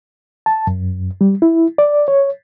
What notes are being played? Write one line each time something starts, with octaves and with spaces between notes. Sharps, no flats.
A5
F#2
G3
E4
D5
C#5